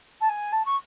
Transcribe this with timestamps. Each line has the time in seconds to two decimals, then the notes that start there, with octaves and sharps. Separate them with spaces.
0.20 A5
0.29 G#5
0.52 A5
0.65 C#6